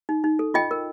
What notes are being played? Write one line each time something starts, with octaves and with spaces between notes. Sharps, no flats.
D#4
D#4
A4
F4 D#5 G5
A#4